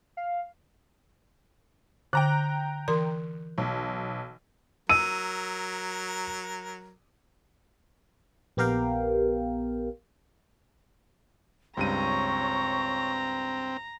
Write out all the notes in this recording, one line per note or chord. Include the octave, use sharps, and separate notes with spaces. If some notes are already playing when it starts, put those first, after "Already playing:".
F5
D3 G5 A#5 F#6
E3 A#4 C6
B1
F#3 A#4 E6 D#7
A#1 B3 G4 A#4 F5 G5
C#2 G2 C4 C#5 A#5 C#6 D#7